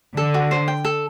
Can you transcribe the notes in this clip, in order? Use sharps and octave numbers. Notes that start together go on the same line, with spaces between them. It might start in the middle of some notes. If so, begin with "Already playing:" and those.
D3 A4
F#4
C5
G5
A4